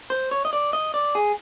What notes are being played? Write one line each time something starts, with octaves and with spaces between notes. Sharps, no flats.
C5
C#5
D#5
D5
D#5
D5
G#4